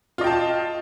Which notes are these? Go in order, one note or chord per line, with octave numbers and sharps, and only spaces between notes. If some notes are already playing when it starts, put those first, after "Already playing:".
F4 D#5 G5 A5